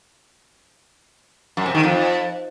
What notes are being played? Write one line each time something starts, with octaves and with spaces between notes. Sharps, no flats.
F#2
C3
D#3
F2